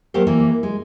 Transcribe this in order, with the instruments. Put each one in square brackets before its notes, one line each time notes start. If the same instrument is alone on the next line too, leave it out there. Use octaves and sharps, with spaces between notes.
[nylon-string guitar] F#3 A3 A#3 G4 A#4 C5
E3 A#3
G#3